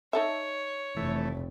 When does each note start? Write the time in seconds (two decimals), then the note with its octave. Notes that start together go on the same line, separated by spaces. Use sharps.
0.13 D#4 A4 C#5 E5
0.97 F1 E3 A3